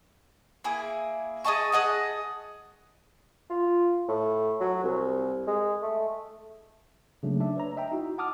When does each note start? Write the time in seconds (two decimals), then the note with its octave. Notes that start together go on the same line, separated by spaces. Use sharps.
0.64 A#3 E4 G#4
1.45 G#4 D#5 A5 C#6
1.72 G#4 D#5 F#5 A5
3.50 F4
4.08 A2
4.60 F#3
4.83 C2
5.47 G#3
5.82 A3
7.23 C#3 F#3 A3 A#3 D4
7.40 D4 D#4 E5
7.56 B4 C#5 A#5
7.77 D#5 E5 G5 A#5
7.92 D#4 E4 F#4
8.18 F#5 A5 D6 D#6 F6